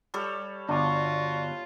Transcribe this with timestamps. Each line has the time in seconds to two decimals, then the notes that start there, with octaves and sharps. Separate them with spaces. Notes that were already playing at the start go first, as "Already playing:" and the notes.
0.14 G3 A4 C#5
0.69 G1 D4 F4 F#4